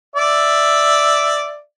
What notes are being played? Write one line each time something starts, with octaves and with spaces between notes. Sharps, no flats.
D5 E5